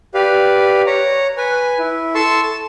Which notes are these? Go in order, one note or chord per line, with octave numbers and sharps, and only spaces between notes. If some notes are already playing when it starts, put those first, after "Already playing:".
G4 B4 D5 F5
C#5 A#5
B4 G#5
E4
A4 A5 C6 C#6 E6
A5